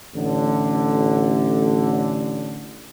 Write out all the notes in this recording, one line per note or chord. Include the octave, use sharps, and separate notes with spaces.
A1 D3